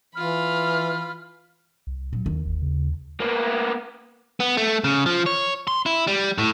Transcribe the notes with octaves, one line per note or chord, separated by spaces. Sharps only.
E3 F4 B5 F6
C2
A#2 F#3
D#2 D#3
G1
C#3
A#3 B3
B3
A3
C#3
F3
C#5
C6
E4
G3
A2